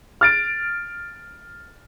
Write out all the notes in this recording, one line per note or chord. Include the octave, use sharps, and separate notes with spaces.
F6 A6 D7